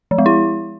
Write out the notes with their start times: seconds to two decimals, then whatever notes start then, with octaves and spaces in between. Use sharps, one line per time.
0.11 F3
0.18 G#3
0.26 E4